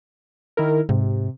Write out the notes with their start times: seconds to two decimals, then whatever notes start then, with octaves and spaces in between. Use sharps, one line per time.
0.57 D#3 E4 A#4
0.89 G#2 C3